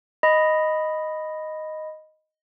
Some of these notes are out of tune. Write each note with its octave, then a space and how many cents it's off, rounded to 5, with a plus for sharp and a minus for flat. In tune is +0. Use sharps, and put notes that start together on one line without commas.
D#5 +0 B5 +0